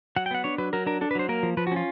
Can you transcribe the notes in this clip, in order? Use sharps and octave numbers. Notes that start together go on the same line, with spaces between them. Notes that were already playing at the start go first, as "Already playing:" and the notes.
F#3 F#5
G5
B3 F#5
D4 C#5
F#3 B4
F#3 A#4
D4 A#4
D4 A4
B4
F#3 C5
A#3 A#4
F3
F3 B4
F#4
C#4 F4